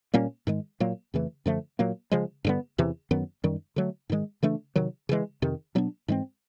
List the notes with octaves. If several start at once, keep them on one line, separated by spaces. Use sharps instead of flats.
A#2 G3 A#3 C#4
G#2 D#3 G#3
A#2 F#3 A#3
F2 C#3 E3 A3
F#2 D3 F3 A3
A#2 F#3 A#3
C#3 F3 G#3
G2 D3 G3 B3
E2 C3 E3
F#2 D#3 F#3 B3
F#2 D#3 G3
D3 F#3 A3
G#2 D#3 G#3
C#3 E3 A3 D4
C3 D#3 F#3
C#3 E3 G#3
F2 C3 D#3
B2 F#3 B3 D4
G#2 E3 G#3 C4